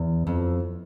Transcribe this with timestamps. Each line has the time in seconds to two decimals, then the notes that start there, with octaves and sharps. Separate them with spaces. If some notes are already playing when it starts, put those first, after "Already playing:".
Already playing: E2
0.27 F2